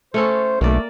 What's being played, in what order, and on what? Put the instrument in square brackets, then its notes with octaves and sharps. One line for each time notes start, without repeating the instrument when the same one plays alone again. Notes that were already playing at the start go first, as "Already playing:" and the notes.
[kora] A3 C#4 A4 [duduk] C5
[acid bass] B1 [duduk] A3 [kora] A#3 D5